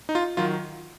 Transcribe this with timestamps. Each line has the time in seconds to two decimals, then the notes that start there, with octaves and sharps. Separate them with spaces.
0.09 D#4
0.15 F4
0.37 D#3 F#3 F4